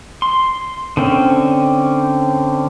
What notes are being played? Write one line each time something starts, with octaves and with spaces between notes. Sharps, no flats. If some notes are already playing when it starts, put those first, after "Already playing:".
C6
D3 C4 C#4